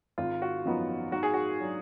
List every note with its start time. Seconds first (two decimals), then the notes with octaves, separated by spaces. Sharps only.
0.18 G#1 F4
0.42 F#4
0.65 F#2 F3 B3 D#4
1.12 G#2 F#4
1.23 G#4
1.34 F#4
1.60 F#3 D4